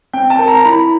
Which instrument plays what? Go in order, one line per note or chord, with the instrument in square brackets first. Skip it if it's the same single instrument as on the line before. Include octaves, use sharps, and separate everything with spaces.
[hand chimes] C4 [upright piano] G5
[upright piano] A5
[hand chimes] A#4
[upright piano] A#5
A#5
[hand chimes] E4 [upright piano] B5